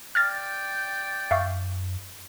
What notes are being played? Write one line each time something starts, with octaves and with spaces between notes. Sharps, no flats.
D5 G5 F6 G#6 A6
F#2 E5 F5 C#6